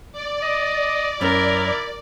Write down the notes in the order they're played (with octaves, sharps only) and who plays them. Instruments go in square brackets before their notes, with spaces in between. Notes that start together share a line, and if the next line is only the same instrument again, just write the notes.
[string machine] D5
[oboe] D#5
[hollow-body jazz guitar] F#2 C#4 [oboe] E4 [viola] A#4